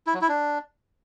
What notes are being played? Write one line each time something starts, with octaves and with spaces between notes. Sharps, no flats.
E4
F#3
E4
D4